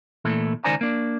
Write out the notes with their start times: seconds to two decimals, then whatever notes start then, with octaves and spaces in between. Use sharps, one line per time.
0.25 A#2 E3 A3 E4
0.64 C#2 D#3 C5 D5 G#5 A#5
0.81 A#3 D4